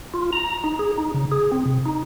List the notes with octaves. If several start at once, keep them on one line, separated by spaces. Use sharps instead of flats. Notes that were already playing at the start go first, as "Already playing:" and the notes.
F4
A#5
D#4
G#4
D#4
C#3
G#4
C4
C3
D#4